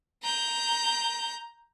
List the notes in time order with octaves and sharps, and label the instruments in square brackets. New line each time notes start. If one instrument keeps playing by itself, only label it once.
[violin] A#5 G6